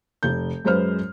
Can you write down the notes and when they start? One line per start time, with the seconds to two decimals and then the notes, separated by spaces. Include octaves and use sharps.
0.23 F1 G6
0.65 F#2 G#3 B4 C5 F6